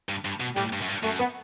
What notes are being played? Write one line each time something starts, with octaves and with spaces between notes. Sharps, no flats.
G2
G2
B2
A2 G3
G2
F#2
G2
F#2 A3
B3